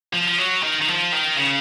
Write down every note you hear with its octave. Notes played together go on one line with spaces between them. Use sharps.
F3
F3
F#3
D#3
D#3
F3
D#3
C#3